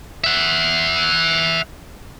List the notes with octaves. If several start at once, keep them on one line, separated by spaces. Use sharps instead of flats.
E5 F#5